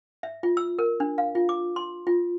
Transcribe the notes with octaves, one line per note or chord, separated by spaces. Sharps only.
E5
F4
E6
A#4
D4
F5
F4
D6
C6
F4